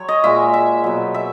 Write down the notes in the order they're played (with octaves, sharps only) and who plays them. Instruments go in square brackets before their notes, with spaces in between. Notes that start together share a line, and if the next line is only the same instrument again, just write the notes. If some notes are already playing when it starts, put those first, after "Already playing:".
Already playing: [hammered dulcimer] F#3 C#5
D#5
A#2 G#3 E5
E5
B2 F#3
E5